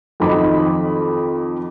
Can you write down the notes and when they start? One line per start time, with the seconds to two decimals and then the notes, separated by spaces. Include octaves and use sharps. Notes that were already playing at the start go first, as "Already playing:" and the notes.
0.20 F2 D#3 F#3 D#5 B5 D6